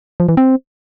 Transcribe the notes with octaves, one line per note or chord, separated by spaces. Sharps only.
F3
E3
C4